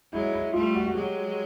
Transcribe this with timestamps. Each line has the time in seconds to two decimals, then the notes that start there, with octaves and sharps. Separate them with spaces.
0.12 F#3 G#3 E4
0.33 E4
0.54 G3 A3 F4
0.74 F#4
0.86 F#4
0.95 F#3 G#3 G4